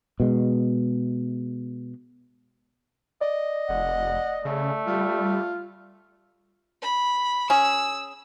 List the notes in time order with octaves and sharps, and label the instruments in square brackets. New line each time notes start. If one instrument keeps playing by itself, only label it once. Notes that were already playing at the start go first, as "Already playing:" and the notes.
[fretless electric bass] B2 G#3
[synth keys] D5 [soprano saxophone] D#5
[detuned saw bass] F1 [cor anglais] F#5
[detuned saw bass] C#3 [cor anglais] A3
[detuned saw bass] G3 [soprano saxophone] F4
[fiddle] B5
[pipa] C#4 G#4 [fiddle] E6